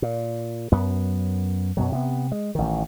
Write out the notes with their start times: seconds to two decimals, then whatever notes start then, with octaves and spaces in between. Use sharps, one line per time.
0.02 A#2
0.72 F#2 B3
1.77 F#2 B2 F#3
1.92 C3 B3
2.32 G#3
2.55 A1 D#3